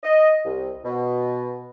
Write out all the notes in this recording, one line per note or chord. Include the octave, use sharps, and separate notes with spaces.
D#5
C2
B2